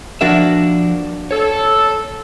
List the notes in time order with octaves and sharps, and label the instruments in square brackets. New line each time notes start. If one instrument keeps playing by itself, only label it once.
[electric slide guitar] F3 A#4 E5 [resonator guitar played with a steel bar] A#3 D4 F#4
[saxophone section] A4 [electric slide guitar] C#5